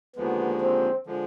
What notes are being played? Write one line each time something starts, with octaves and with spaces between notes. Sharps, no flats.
D#2 D3 F3 G#3 B3
C4
D3 F3 G#3